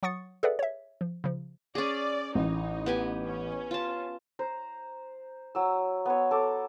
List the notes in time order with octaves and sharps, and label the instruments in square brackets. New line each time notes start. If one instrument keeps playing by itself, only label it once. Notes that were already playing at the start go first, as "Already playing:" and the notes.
[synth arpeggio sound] F#3 F#5 C#6 D#6 A6 C#7
G#4 A4 B4 D5 E5 F#5
C#5 E5
F3
C#3 F3
[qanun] C#4 G#4 [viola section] D5
[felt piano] A1 [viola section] D#4
[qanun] B3 G4 G#5
[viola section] C#4
[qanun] F4 A5
[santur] C5 A#5
F#3 E6
B3 C#5
A4 D6